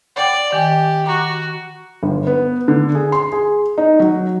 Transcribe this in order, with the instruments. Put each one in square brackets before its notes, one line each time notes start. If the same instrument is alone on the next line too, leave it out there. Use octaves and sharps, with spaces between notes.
[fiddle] D5 [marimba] F#5 G5 D6
[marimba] D#3 G#5 [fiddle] G4
[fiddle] F#4 [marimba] A#5 D6
[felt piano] G1
B3
D3
G#4
C6
G#4
D#4
F#3